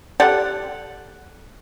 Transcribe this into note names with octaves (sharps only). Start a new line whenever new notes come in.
G4 A4 D5 F#5